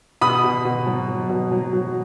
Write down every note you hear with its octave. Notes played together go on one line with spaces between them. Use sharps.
B2 B5 D#6
B2
B2
F#3
F#3
B2
F#3
F#3